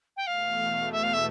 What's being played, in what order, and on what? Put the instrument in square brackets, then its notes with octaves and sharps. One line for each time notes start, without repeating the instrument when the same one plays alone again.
[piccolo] G5
[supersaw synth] E2 B2 A3 [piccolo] F5
[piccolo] E5
F5
E5